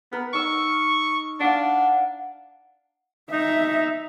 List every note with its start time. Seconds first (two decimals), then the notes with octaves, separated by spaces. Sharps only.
0.13 B3 A#4
0.33 D#4 C#6 E6
1.40 D4 F5 F#5
3.32 D#4 E5